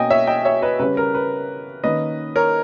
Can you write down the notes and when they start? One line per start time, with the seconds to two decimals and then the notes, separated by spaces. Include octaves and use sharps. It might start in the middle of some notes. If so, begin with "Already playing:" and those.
Already playing: B2 A#3 C#4 D#5 G5 G#5
0.10 C#5 E5
0.27 D#5 G5
0.45 C#5 E5
0.62 B4 D#5
0.79 C#3 G3 C#4 B4
0.97 A#4
1.15 B4
1.83 D#3 A#3 C#4 B4 D#5
2.36 A#4 C#5